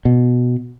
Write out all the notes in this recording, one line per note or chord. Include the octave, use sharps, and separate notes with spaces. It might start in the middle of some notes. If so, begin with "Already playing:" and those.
B2